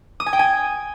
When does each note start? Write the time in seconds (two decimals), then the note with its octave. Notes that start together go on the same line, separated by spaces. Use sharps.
0.20 D#6
0.26 G#5
0.33 G5
0.39 G#5